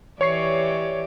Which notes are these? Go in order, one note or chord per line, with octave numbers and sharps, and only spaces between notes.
E3 G4 C#5 D5 C#6 C7